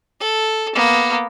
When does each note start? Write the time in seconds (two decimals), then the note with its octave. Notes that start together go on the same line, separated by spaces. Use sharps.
0.20 A4
0.75 A#3 B3